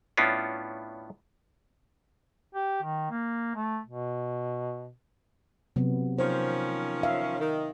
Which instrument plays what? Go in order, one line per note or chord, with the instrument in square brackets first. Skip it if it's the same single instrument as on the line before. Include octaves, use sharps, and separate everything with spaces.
[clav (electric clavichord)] A2 B3 C#4 D4 E4 F4
[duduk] G4
D#3
A#3
A3
B2
[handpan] C3 F#3 B3
[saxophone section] D#3 F3 C#4 [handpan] C5
[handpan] E5 F5
[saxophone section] D#3